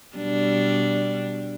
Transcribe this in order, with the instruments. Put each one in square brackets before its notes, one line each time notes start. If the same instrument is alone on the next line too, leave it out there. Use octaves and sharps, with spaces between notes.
[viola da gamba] B2 G3 D4